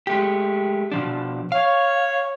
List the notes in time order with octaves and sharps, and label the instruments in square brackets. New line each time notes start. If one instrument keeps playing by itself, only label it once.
[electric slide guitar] G#3 A3 G4
B2 F3 D4
[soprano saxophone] C#5 [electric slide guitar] F5